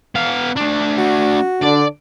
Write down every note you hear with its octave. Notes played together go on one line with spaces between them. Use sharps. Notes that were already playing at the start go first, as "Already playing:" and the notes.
B3 F5
A3 D4
F#4
D3 D4 D5